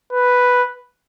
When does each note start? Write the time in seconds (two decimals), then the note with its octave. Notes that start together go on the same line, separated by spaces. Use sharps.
0.12 B4